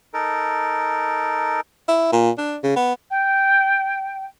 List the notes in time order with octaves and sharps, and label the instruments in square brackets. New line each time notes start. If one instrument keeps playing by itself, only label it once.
[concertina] D#4 A4 A#4
[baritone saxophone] E4
A#2
D4
C#3
B3
[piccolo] G5